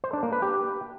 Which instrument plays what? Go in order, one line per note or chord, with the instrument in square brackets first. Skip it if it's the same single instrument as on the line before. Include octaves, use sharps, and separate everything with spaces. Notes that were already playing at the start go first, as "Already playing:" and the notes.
[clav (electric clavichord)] C5
D4
A#3
B4
G4